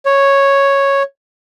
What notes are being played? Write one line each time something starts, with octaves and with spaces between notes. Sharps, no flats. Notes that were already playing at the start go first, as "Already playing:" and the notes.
C#5